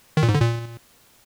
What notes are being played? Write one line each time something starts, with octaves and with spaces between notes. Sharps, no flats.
D#3
A#2
G#2
D3
A#2